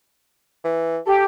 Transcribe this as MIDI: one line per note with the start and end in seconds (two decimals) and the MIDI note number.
0.64 0.99 52
1.06 1.25 67
1.06 1.26 69